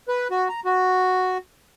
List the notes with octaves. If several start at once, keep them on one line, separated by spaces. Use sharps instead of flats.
B4
F#4
A#5
F#4